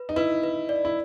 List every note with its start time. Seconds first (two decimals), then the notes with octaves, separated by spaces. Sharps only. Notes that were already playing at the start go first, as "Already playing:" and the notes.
Already playing: B4
0.09 D#4
0.16 E4 B4
0.43 B4
0.69 D5
0.85 E4